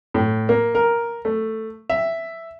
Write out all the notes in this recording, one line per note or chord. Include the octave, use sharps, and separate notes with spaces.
A2
A#3
A#4
A3
E5